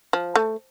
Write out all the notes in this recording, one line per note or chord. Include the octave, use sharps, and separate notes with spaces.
F3
A3